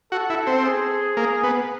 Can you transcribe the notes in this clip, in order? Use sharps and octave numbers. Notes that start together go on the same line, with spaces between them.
F#4 A4
E4
C4
G#4
A#3
B3